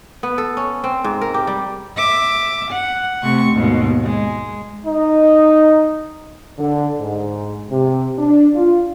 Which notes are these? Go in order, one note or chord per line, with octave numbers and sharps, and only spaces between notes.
B3
A4
C#4
C4
G#2
A#4
G4
G3
E5 D6
F#5
C3 A3 C#6
D#2 G#2 B2
G#3
D#4
D3
G#2
C3
D4
F4